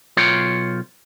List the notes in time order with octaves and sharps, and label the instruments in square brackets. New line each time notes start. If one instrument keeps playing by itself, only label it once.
[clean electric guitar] B1 F4 C#5 G5